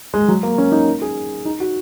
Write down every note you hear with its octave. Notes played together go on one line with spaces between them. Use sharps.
G#3
F#3
A#3
C#4
D#4
G#4
D#4
F#4